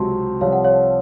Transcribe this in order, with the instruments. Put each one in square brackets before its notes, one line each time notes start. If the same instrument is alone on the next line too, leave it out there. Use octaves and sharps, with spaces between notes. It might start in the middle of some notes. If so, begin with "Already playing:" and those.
Already playing: [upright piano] C#2 C3 F#3 C4 [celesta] A5 C6
[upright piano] C2 C3 F3 [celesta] C#5 F5
[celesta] F#5
C#5 F5